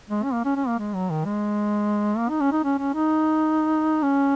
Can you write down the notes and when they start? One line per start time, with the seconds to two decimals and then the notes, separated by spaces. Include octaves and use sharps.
0.09 G#3
0.23 C#4
0.33 A#3
0.44 C#4
0.56 C#4
0.67 A#3
0.79 G#3
0.94 F#3
1.10 D#3
1.25 G#3
2.17 A#3
2.30 D#4
2.41 C#4
2.52 D#4
2.64 C#4
2.79 C#4
2.94 D#4
4.03 C#4